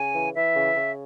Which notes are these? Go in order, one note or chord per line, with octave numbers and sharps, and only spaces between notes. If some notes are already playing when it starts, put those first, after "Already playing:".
Already playing: C#3 G#5
E3
E3 E5
C#3
C#3